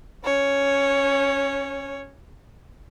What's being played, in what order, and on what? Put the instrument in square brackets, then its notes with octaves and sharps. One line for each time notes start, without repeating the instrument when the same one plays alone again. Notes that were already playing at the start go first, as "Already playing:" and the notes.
[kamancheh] C#4 C#5